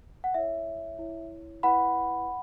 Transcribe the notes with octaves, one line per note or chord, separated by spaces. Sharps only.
F#5
E4 C#5 E5
E4 C#5
E4 B4 F#5 B5